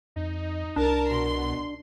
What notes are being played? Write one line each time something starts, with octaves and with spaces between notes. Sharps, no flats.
F2 D#4
C2 D4 A#4 A5
B2 C6